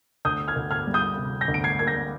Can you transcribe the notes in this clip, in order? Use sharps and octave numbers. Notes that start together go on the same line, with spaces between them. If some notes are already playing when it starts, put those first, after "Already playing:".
D2 D#6 G6
F6 G#6
D2
F6 G#6
G3
D#6 G6
C3
G6 A#6
D2
D7
G#6 C7
A#3 G#6
G6 A#6